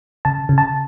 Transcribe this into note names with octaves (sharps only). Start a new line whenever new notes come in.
C#3 A5
C#3
A5